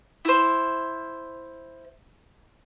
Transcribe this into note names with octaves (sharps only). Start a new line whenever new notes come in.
E4 C5